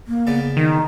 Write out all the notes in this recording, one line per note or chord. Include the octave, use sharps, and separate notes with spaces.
A#3
C#3 B3 D5
D#3 D#4